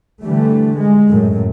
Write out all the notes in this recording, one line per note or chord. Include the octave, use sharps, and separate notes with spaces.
D3 E3 G3 A3
G#3
F#2 A2